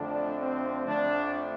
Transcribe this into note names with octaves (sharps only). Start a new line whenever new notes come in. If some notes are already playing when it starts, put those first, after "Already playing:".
Already playing: F2 D3 A3 D4
C4
F2 D3 A3 D4